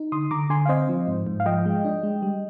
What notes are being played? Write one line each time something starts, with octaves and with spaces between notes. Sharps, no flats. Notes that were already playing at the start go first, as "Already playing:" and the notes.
Already playing: D#4
D3 C6 D#6
D3 A#5 D6
D3 G#5 C6
F5
C4 C5 D#5
F3
G#2
G#2
F5
F3 D#5 G5
G#3
D4
G#3
G3